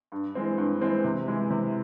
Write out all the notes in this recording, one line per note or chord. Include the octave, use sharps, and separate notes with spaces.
G2
E3 G#3 C4
G2
E3 G#3 C4
C3
E3 G#3 E4
C3